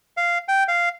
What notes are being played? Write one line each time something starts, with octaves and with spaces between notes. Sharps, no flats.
F5
G5
F5